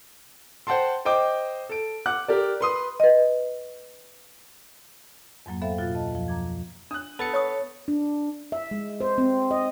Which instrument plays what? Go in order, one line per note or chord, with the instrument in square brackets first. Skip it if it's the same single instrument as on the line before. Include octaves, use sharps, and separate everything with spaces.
[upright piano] C5 F#5 G5 A5 C6
C5 D#5 G5 D6
A4 D7
F#5 D6 F#6
G4 A#4 D5
B4 C6 D#6
[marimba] B4 D#5
F2 G#2 F#3 A#3
B3 A4 C5 E5 F5 G5
B2 F4 F#4 F5 A6
D2 D#5 A5
F2 F3
A#5 D6 G#6
[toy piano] D4 [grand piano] D#6 F#6
[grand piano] B3 [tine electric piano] A4 A6 C#7
[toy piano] C#5 C#6 D#6
[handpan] D4
E5
G#3
C5
C4
D#5